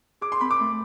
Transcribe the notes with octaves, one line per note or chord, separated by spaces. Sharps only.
G#4 D6
C6
C4 B5
D6
A3